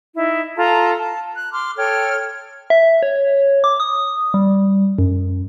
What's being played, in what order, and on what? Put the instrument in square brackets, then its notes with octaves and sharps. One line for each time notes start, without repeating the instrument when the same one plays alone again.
[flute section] D#4 E4
F4 A4 A5 A#5
A5
F#6
C6 D6 F6
A4 C#5 G5 F6
[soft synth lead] E5
C#5
D6
D#6
G3
F#2